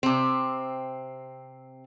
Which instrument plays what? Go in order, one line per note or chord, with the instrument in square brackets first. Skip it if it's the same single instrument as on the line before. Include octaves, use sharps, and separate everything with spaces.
[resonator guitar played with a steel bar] C3 C4